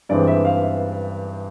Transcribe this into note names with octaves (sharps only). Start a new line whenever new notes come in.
G2 E3 G#3 C4 D5
E5
F5
E5